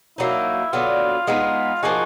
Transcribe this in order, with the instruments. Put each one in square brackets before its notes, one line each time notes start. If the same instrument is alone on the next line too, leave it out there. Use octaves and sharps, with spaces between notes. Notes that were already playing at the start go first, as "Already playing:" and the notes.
[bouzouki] F#3 A#3 D#4 [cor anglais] E4
[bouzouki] D3 F#3 B3 [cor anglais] F4
[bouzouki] G#3 B3 D#4 [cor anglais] F4
[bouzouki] F3 A#3 D#4 G#4 [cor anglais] F#4